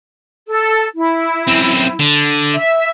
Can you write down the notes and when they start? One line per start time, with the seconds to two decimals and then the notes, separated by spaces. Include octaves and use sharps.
0.48 A4
0.96 E4
1.47 F#2 C4
2.00 D3
2.54 E5